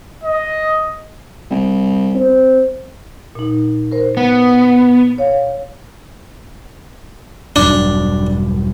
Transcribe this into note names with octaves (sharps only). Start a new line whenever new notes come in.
D#5
C2
C4
A#2 D#4
A#4 C5
B3
C#5 F5
E1 G2 F#3 D4